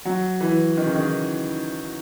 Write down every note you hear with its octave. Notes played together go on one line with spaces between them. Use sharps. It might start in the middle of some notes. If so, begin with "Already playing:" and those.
F#3
E3
D#3
C#3
D#3